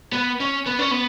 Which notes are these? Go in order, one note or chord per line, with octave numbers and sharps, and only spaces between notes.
B3
C#4
B3
C#4
B3